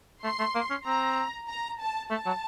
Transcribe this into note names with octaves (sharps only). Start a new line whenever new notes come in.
A3 C6
A3
A#3
C#4
C4 A#5
A#5
A5
A3 A5
F#3